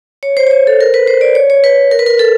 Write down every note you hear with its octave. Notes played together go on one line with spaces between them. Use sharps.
C#5
C5
C#5
C5
A4
A#4
B4
C5
D5
C#5
C#5
B4
A#4
B4
A#4
A4